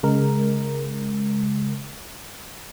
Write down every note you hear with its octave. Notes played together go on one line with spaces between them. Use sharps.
C#3 G#3 A#4